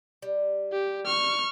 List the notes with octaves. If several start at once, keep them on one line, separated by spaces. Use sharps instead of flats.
G3
G4
C#6 F6